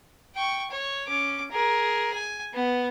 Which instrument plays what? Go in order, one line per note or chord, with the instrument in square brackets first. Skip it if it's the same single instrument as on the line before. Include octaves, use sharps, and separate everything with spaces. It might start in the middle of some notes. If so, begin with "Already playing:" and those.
[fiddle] G5 C#6
C#5
C#4 D6
G#4 A#4
G#5
B3